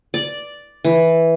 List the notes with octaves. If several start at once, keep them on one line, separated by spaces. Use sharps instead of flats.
D5
E3